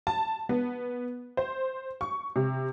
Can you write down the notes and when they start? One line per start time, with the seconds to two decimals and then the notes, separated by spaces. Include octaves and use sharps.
0.07 A5
0.49 B3
1.37 C5
2.01 C#6
2.36 C3